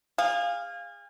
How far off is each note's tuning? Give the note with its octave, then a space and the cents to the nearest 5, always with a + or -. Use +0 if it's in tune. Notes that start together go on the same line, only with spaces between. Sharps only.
G#4 -35 F5 +0